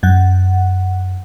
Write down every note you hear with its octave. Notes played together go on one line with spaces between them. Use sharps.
F#2 F#5